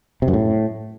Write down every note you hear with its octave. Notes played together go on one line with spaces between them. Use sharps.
C3
F#2
A2